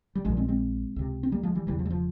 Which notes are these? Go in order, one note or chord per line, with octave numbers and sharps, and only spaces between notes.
G3
A#1 A#2 F3 G#3
G#3 C4
G#3 C4
C#2 C3
C4
G3 A#3
F3 G#3
E3 G3
E1 E2 C#3 E3 G3
F3
G3
F3